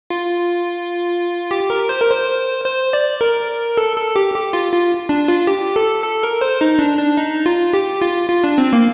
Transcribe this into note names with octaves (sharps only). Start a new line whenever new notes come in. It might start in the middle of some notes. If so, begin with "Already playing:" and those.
F4
G4
A#4
C5
A#4
C5
C5
D5
A#4
A4
A4
G4
G4
F4
F4
D4
F4
G4
A4
A4
A#4
C5
D#4
D4
D4
D#4
F4
G4
F4
F4
D4
C4
A#3